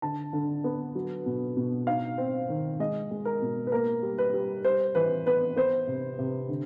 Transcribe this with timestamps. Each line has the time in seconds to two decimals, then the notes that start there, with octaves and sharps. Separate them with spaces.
0.02 D3 A5
0.33 D3
0.64 B3
0.95 F#3
1.26 B2
1.57 B2
1.87 D#4 F5
2.18 C4
2.49 D#3
2.80 G#3 D#5
3.11 G#3
3.25 A#4
3.42 B2
3.67 B4
3.72 A#3 A#4
4.03 G3
4.18 B4
4.34 G3
4.64 G3 C5
4.95 E3 B4
5.26 B3 B4
5.56 B3 C5
5.87 C3
6.19 C3
6.49 D3